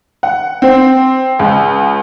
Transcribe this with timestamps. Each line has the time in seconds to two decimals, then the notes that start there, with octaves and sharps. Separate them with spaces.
0.23 F#5
0.62 C4
1.39 C#2